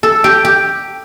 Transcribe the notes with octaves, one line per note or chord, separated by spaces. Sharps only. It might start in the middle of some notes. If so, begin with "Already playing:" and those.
A4
G4
G4